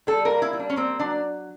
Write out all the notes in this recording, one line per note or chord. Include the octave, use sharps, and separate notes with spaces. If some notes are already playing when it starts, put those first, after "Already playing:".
G3 A4
A#4
A#3
E4
G3
D4
C#4
A#3 C4
F#3 D4